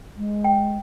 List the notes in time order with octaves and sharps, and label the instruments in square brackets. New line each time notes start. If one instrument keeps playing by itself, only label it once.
[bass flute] G#3
[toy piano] G5